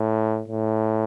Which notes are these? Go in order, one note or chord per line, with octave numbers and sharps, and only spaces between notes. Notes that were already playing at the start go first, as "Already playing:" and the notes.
Already playing: A2
A2